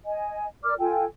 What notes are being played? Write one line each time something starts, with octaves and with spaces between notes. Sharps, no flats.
D#5 G#5
A#4 D5 D6 F6
F4 A4 G5 G#5